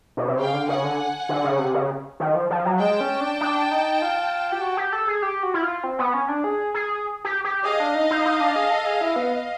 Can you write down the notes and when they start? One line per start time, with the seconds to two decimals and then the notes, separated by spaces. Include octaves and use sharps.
0.17 B2
0.28 C3
0.38 C#3 F5 G5
0.53 D3
0.68 C#3 F#5 G#5
0.84 D3
1.29 D3
1.44 C#3
1.59 C3
1.74 C#3
2.20 D#3
2.35 F3
2.50 F3
2.65 F#3
2.80 G#3 G5 A5
3.01 C#4
3.21 D4
3.41 D4
3.71 D#4
4.02 F4
4.52 G4
4.61 F#4
4.77 G4
4.93 A4
5.08 G#4
5.22 G4
5.43 F#4
5.54 E4
5.63 F4
5.84 C4
5.99 B3
6.14 C#4
6.29 D4
6.44 G#4
6.74 G#4
7.25 G4
7.44 G4
7.65 G#4 D#5 F5
7.80 D4
7.95 D#4
8.10 D#4
8.25 D#4
8.41 D4
8.56 G#4
8.71 A4
8.86 G#4
9.01 E4
9.16 B3